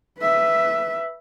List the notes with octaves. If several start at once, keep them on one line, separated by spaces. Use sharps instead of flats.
B4 E5